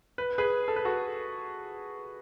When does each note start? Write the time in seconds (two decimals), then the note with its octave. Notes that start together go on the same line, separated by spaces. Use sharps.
0.18 B4
0.38 G#4 B4
0.68 A4
0.76 B4
0.85 F#4 A4